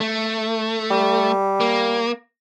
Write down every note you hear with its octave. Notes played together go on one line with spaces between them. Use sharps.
A3
G3
A#3